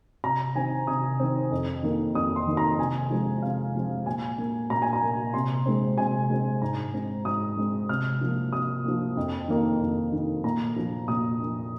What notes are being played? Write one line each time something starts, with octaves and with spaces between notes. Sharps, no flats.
C3 A#5
D#3 C4 G#5
C3 D#6
D#3 C4
F2
D#3 A#3
F2 D#6
C6
D#3 A#3
A#5
C3 G#5
F3 G#3 C4
C3 F5
F3 G#3 C4
A#2 G#5
A#3
A#2 A#5
G#5
A#5
A#3
C3 C6
G#3 C4
C3 G#5
G#3 C4
G#2 A#5
G#3 C4
G#2 D#6
G#3 C4
C3 F6
F3 A#3
C3 D#6
F3 A#3
F2
D#3 A#3
F2
D#3 A#3
A#2 A#5
F3 A#3
A#2 D#6
F3 A#3